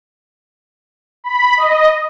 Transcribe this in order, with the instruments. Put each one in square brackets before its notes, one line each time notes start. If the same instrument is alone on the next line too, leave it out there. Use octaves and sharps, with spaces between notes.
[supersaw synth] B5
D#5